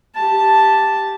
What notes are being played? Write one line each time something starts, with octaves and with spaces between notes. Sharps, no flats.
G4 A5